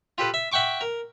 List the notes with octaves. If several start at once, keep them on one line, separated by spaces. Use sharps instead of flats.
F4 G4 A4 B4
E5
E5 F#5 G5 C#6 D6
A#4